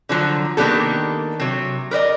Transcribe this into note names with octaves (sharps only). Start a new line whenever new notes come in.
D3 F3 F#3
D#3 A#3 B3 D4 G4 A4
C3 F#3
A#4 B4 D5 D#5